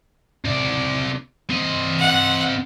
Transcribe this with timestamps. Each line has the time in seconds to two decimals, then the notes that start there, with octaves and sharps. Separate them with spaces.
0.45 C3 D5
1.50 C4 D#5
1.99 F#5